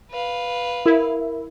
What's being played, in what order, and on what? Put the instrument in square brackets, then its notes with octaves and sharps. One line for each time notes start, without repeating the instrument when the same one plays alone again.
[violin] B4 F5
[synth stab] E4 [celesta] A#4